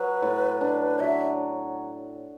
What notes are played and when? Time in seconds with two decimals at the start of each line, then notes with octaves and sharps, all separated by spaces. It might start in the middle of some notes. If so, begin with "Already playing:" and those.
Already playing: F#3 F#4 B4
0.22 A2
0.61 D4
1.00 F#3 E5